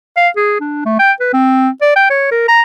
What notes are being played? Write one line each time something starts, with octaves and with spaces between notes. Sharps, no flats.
F5
G#4
D4
A3
G5
B4
C4
D5
G5
C#5
A#4
A#5